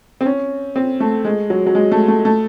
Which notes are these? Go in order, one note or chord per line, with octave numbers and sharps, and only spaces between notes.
C4
C#4
C4
A3
G#3
F#3
F#3
G#3
A3
A3
A3